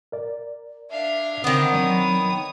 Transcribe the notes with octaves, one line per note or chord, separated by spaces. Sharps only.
A#4 D5
D4 E5 F5
D3 D#3 B3 C4 C5
F#3 C#5 D#6